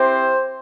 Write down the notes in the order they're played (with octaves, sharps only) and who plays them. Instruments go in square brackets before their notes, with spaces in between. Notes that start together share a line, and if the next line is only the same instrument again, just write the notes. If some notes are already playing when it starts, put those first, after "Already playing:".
Already playing: [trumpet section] C4 E4 G4 C5